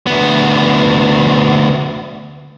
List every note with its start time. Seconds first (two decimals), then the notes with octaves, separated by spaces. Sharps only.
0.06 D2 B3